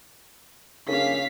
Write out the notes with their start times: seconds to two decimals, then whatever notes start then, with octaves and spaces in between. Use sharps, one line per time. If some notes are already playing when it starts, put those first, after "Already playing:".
0.88 C#3 A#3 C#4 D4 F5 B6